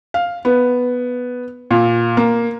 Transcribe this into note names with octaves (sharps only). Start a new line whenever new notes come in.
F5
B3
A#2
A#3